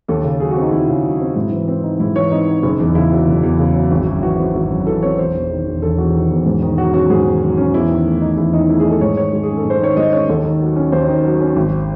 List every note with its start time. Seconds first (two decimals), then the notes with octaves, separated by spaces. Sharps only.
0.08 D#2 A4
0.24 C#3
0.40 F#3 G#4
0.51 F#4
0.56 C4
0.62 D#4
0.72 D#2 E4
0.88 C#3
1.04 F#3
1.20 C4
1.36 G#2 E4
1.52 E3
1.68 C4
1.84 D#4
2.00 G#2 E4
2.16 E3 C#5
2.31 C4 D#4
2.48 D#4
2.63 F#1
2.79 E2
2.95 C#3 E4
3.11 F#3
3.27 F#1
3.43 E2
3.59 C#3
3.75 F#3
3.91 G#1
4.07 F#2
4.23 E3 F#4
4.38 C4
4.55 G#1
4.70 F#2
4.87 E3 A4
5.03 C4 C#5
5.19 E1 C5
5.35 E2
5.51 D#3
5.66 E1
5.82 E1 A4
5.98 E2 F#4
6.14 D#3
6.31 E1
6.46 G#2
6.62 D#3
6.78 F#3 F#4
6.94 C#4 F#4
7.10 G#2 G#4
7.26 D#3
7.42 F#3
7.57 C#4
7.74 E2 E4
7.90 D#3
8.05 A3
8.21 D#4
8.37 E2 E4
8.53 D#3 D#4
8.69 A3 E4
8.80 G#4
8.85 D#4
8.90 A4
9.01 G#2 C#5
9.17 D#3 C#5
9.33 G#3
9.43 G#4
9.49 C#4
9.57 A4
9.65 G#2
9.70 C5
9.81 D#3 C#5
9.97 G#3 D#5
10.13 C#4 C#5
10.29 D#2 A4
10.45 D#3
10.61 F#3
10.76 C#4
10.92 D#2 C5
11.08 D#3
11.24 F#3
11.40 C#4
11.56 G#1